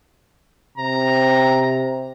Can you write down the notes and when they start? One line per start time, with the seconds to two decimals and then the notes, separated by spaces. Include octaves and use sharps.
0.78 C3 A#5